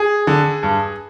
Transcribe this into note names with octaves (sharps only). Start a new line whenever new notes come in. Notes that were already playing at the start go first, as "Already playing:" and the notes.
Already playing: G#4
D3
G2